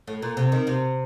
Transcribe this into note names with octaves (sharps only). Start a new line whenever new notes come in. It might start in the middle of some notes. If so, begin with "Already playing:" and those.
A2
A#2
C3
D#3
C3